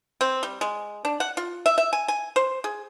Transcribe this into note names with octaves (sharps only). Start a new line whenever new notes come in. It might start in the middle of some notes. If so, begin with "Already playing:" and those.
C4
G3
G#3
D4
F#5
F4
E5
E5
G#5
G#5
C5
G#4